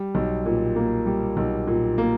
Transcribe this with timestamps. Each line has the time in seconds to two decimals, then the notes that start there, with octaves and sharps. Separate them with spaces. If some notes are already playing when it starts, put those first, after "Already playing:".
Already playing: G3
0.15 B1
0.46 A#2
0.76 A#3
1.06 G3
1.37 B1
1.67 A#2
1.98 A#3